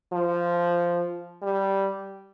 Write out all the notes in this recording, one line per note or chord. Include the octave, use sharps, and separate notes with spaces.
F3
G3